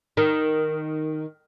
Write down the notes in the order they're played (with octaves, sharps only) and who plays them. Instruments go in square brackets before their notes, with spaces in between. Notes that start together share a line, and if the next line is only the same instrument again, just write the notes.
[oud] D#3